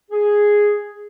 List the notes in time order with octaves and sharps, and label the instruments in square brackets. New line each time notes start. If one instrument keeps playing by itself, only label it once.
[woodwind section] G#4